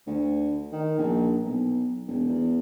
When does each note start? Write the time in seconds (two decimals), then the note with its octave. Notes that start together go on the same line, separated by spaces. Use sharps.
0.07 D2
0.72 D#3
0.98 A#1
1.43 B1
2.07 E1
2.29 E2